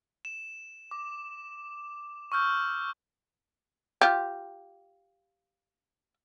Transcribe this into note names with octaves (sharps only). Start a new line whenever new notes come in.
E7
D6
C#6 E6 F6 G6
F4 G4